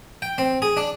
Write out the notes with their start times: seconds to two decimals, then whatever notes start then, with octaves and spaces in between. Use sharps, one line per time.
0.22 G5
0.38 C4
0.62 G#4
0.77 D4